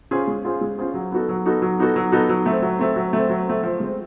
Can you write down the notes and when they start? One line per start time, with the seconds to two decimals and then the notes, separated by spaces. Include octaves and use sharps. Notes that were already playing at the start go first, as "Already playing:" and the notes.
0.11 C#4 F4 G#4 C5
0.27 G#3
0.44 C#4 F4 G#4 C5
0.61 G#3
0.78 C#4 F4 G#4 C5
0.94 F#3
1.12 B3 D#4 F#4 A4
1.29 F#3
1.46 B3 D#4 F#4 A4
1.62 F#3
1.79 B3 D#4 F#4 A4
1.96 F#3
2.12 B3 D#4 F#4 A4
2.29 F#3
2.46 A3 C4
2.62 F#3
2.79 A3 C4
2.96 F#3
3.13 A3 C4
3.29 F#3
3.47 A3 C4
3.63 F3
3.80 G#3 C4